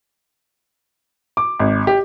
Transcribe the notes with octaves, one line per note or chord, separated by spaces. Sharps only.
D6
G#1
G4